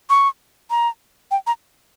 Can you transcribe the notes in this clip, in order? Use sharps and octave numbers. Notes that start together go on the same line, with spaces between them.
C#6
A#5
G5
A#5